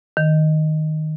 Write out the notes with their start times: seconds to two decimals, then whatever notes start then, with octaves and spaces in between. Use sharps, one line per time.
0.17 D#3